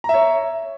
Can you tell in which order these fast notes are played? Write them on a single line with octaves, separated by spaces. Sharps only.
A#5 E5 C#5